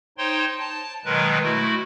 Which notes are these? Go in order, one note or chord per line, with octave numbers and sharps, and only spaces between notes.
D#4 C5 C#5 G5 C6
A5
B2 D#3 F#3 G#3 A#4 B4
A3 E4 F#4